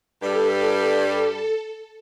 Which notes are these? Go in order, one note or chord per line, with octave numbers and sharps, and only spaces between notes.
G2 G3 A4